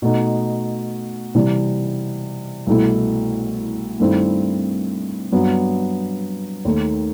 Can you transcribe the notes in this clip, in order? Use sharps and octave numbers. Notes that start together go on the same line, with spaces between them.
B2 A3 D#4
C3 E3 G3
C2 B2 A3 E4
G2 D#3 A3 C4 E4
G2 F#3 B3
D#2 D#3 A3